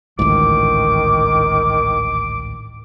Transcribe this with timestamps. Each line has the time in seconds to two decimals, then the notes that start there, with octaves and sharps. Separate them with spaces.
0.19 A1 D2 G#2 D#3 D6